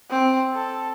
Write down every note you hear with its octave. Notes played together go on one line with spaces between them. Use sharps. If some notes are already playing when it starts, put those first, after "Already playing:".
C4
A4